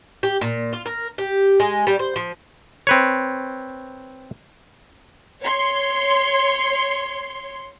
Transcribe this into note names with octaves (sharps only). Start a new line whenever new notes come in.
G4
A#2
F4
A#4
G4
G#3
G3
C5
F3
C4 B4 C#5
C#5 C6